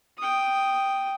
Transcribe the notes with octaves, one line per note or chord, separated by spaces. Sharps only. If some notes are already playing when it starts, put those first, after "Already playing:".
G5 D#6